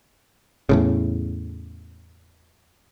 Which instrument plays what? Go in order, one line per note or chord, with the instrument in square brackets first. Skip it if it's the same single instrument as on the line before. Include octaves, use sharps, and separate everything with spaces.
[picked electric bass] E2 A2 C#3